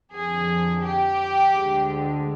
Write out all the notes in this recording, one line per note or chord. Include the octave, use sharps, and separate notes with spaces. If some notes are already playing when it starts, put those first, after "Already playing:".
F2 D3 F3 G#4
G4
D2 D3 G#3